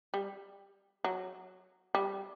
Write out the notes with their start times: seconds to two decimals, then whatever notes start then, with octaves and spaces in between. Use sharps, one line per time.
0.14 G3
1.04 F#3
1.95 G3